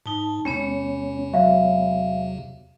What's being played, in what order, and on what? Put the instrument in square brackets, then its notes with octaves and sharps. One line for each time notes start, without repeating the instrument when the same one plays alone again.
[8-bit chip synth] G#2 [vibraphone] D#4 A5
[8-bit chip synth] E2 C3 [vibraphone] G#3 B3 C#5 [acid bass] C#4
[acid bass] F#3 [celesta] E5 F5